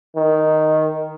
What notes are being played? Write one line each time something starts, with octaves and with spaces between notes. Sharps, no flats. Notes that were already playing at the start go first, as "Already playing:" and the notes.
D#3